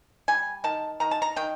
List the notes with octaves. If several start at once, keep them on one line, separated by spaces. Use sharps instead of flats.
G3 G#5
D#3 A5
D#3 A#5
A5
A#5
D#3 G5